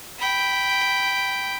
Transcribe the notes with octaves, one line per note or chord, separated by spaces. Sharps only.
G5 B5